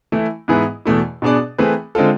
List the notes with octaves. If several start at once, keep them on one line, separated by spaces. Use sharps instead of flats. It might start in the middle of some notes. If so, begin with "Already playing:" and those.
E3 A3 E4
G#2 E3 B3 E4 G#4
E2 B2 A3 E4
B2 B3 D4 G#4 D5
E3 A3 C4 G#4 B4
D3 G#3 C4 F4 A4